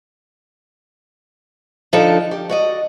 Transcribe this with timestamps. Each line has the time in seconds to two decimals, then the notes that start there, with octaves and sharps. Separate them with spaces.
1.93 D3 F3 D4 D#4 A4
2.31 G4
2.49 F#4 D5 D#5